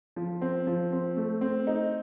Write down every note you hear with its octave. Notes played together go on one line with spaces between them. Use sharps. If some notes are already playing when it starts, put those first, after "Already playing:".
F3
C4
F3
C4
A3
C4
D#4